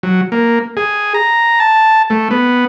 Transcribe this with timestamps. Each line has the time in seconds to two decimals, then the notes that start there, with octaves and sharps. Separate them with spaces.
0.03 F#3
0.32 A#3
0.77 G#4
1.14 A#5
1.60 A5
2.10 A3
2.31 B3